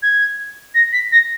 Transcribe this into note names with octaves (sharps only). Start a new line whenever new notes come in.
G#6
A#6
B6
A#6